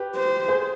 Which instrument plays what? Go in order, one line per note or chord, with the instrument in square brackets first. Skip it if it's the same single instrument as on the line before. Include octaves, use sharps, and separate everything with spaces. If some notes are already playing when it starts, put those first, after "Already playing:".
Already playing: [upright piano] G4 B4
[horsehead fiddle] C5
[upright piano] G#4 C5